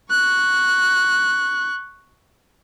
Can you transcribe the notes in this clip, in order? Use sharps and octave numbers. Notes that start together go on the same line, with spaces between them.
C#6 F#6